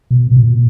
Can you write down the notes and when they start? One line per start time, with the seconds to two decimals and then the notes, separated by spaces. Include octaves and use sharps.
0.11 B2
0.31 B2
0.37 A#2